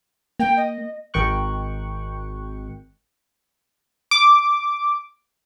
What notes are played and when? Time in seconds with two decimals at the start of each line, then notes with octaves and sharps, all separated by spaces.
0.40 A#3 G5
0.57 D#5
1.14 G#1 D#3 G5 C#6 F#6
4.11 D6